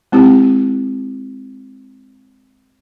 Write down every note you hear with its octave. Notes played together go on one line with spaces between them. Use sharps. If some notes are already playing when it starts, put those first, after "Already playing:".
G#3 C4 E4 G4